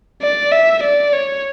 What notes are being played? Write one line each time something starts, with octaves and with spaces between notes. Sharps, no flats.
D5
E5
D5
C#5